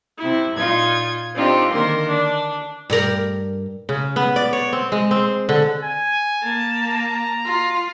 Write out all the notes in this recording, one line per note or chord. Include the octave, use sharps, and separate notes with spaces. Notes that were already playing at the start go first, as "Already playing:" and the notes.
C3 E4
A#2 D#4 F4 G#6
C4 D4 D#4 F4 G4
D3 D#3 A#3 A#4 C6
D4
G2 G4 A#4
C#3
B3
D5
C#5
C4
G#3
C4
D3
G#5
A#3 A5
A#5
F4